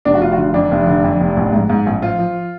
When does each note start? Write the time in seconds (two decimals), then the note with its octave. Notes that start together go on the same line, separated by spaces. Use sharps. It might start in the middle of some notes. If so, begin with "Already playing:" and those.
0.05 F1 D4
0.14 F#4
0.21 F1 F4
0.32 F#4
0.37 D3 F4
0.54 F2 D4
0.71 F1
0.87 D3
1.04 F2
1.20 F1
1.37 A1
1.53 G#2
1.70 G#2
1.86 A1
2.02 F3 F4
2.19 F3